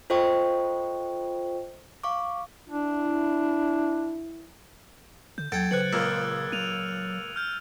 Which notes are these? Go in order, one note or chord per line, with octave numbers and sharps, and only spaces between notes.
F4 A4 C5 D#5 G5 C#6
F5 C#6 D6
D4 E4
D3 G6
D#2 F#3 A4 G5 G#6 A6 D7
C#3 B4 C5 F#6 C#7 F#7
C#2 A#2 G#3 E6 F6
F#3 D#7 F7
F6 G6